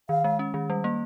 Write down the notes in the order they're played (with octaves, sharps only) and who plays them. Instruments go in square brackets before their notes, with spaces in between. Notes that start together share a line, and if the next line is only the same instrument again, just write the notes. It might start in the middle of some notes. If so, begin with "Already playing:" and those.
[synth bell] D#3 [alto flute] F5
[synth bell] G#3
C#4
D#3
G3
A#3